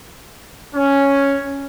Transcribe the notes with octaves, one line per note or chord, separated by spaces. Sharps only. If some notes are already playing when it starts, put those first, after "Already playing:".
C#4